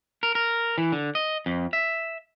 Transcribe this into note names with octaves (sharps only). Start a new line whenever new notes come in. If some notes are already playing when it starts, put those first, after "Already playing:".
A#4
A#4
E3
D3
D#5
F2
E5